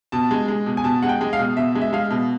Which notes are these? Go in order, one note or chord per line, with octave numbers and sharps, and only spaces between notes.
B2 A5
G#3
G#3
B2
G#5
B2 A5
G#3 F#5
G5
G#3
F5
B2
B2 E5
G#3
E5
G#3 F5
B2